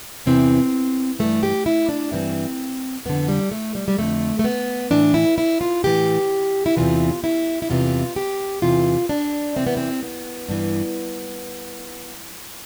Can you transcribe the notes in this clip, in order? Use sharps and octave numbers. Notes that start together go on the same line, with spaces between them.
E2 C3 E3 C4
G2 E3 A3
G4
E4
D4
G2 E3 C4
F2 D3 B3
G3
A3
G3
G3
F2 D3 A3
A3
B3
A2 E3 D4
E4
E4
F4
A2 E3 G4
E4
E2 C3 E3 F4
E4
E4
E2 C3 E3 F4
G4
E2 C3 E3 F4
D4
E2 C3 E3 C4
B3
C4
B3
G2 E3